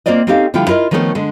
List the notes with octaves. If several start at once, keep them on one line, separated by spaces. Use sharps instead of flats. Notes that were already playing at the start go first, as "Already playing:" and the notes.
A#3 C4 F4 C5 D5 D#5
C4 C#4 D#4 G4 A4 F5
D3 F3 G3 E4 F4 G5
E4 F4 A#4 D#5
D#3 F3 A3 B3 C#4 A4
D3 G#3 A4